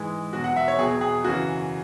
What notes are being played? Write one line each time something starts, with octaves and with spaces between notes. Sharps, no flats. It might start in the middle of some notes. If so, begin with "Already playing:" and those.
Already playing: G#2 E3 G#3
E2 B2 F#3 F#4
F#5
E5
C#5
E2 B2 F#3 G#4
G#4
F#2 C#3 E3 F#4